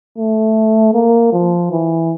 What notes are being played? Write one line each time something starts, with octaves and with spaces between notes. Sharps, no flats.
A3
A#3
F3
E3